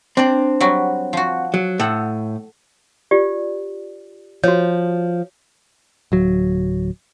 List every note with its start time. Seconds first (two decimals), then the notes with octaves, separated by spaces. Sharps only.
0.17 C4 D4 D5
0.60 F#3 G3 F#4
1.13 F3 F#4
1.54 F#3
1.80 A2 A4 F#5
3.11 F4 G4 D5
4.44 F3 F#4 C#5
6.12 D1 F#3